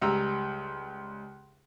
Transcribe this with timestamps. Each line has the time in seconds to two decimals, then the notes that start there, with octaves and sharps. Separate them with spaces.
0.01 C#2 G3 A#5 E6